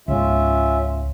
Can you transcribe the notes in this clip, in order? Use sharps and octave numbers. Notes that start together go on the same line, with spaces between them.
C#2 G#2 C#4 F4 E5